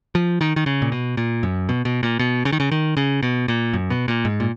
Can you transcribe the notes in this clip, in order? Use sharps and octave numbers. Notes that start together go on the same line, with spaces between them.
F3
D#3
D#3
C#3
A#2
B2
A#2
F#2
B2
B2
A#2
B2
C#3
D#3
C#3
D#3
C#3
B2
A#2
F#2
B2
A#2
G#2
A#2